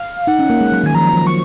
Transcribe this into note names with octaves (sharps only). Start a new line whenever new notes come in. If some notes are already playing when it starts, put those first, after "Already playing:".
Already playing: F5
D#4 F#5
C#4
A#3
G#3
F#3
D#3 G#5
F3 A#5
F#3
F3
F#3 C#6